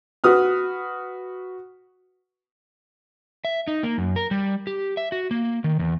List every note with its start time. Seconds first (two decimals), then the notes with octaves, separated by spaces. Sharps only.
0.24 F#4 B4 D#6 F6
3.45 E5
3.68 D#4
3.83 A#3
3.98 F#2
4.16 A#4
4.31 G3
4.67 G4
4.97 E5
5.12 F#4
5.31 A#3
5.64 D#3
5.79 E2